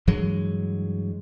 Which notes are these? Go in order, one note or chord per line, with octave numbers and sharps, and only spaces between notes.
G2 E3 F#3 G#3